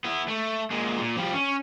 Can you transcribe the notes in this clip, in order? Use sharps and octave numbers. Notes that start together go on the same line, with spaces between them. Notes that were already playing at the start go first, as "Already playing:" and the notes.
B3 E4
A3
A#2 G#3
A#2
F3 G3
C#4